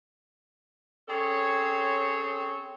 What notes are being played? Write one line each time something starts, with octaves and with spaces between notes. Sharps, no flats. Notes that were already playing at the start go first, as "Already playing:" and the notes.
C4 C#4 G#4 A4 C#5